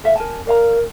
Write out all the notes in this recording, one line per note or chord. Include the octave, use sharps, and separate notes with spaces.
A4 E5 F5
A#4 G#5 A5
A#4 D5 F5 A#5